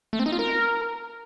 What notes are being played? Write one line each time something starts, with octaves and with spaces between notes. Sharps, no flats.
A3
C4
D#4
F4
A#4